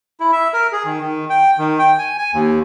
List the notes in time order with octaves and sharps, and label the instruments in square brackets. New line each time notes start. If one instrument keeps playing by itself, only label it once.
[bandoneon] E4
E5
A#4
G#4
D#3
D#3
G5
D#3
G5
G#5
G#5
D#2